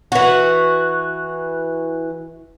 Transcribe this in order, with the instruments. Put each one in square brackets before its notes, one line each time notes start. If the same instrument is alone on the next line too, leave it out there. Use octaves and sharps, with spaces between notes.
[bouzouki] E3 F#4